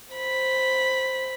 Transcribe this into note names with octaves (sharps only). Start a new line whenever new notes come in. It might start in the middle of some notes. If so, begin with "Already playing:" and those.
C5 B5